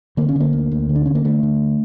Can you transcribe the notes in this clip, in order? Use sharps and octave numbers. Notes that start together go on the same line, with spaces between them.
D3 A#3
C#4
D3 A#3
D2
D2
D3
D4
D3 C#4
A#3
D3 A3
D3